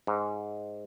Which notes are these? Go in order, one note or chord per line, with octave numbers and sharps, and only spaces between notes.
G#2